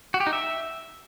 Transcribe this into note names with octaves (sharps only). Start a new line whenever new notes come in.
F#4
G4
D#4
E5